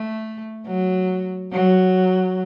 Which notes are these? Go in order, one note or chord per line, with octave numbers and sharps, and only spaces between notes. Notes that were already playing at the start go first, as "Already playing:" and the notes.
Already playing: A3
F#3
F#3